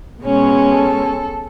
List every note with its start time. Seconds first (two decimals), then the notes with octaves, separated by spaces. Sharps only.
0.22 B2 G#3 C#4 C#5
0.72 A4